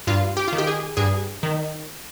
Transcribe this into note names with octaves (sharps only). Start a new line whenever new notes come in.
G2 F4
G4
F4
D#3
G4
G#4
G2 G#4
D#3